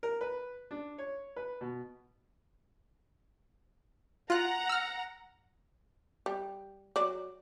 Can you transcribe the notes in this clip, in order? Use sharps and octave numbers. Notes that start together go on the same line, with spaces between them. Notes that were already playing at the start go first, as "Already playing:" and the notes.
A#4
B4
D4
C#5
B4
B2
F4 F#5 A#5 F#6
E6 F6
G3
F#3 D5